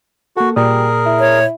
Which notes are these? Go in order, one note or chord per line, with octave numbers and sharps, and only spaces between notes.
A#3 F#4 A4
A#2 G3 G#4 A#4 D5 D#6
E4
C#5